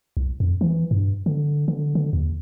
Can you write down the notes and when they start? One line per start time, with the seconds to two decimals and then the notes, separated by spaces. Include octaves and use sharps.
0.17 C2
0.40 F2
0.61 E3
0.91 G2
1.26 D3
1.68 D3
1.95 D3
2.13 D#2